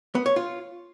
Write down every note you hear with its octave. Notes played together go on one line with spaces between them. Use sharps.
B3
C#5
F4